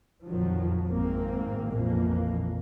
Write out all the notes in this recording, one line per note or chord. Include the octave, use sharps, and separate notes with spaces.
A#1 F2 D#3 F3 F#3
G#1 G#2 A#3 C4
A#1 F2 B2 E3 A#3